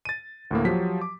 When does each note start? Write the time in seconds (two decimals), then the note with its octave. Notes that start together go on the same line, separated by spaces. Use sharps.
0.05 A6 D#7
0.51 D2 A2 A#3
0.65 F3 F#3 G4 B6
1.01 D6